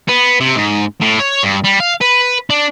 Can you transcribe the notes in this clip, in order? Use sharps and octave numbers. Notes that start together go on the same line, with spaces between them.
B3
C3
G#2
A2
C#5
G2
G3
F5
B4
D4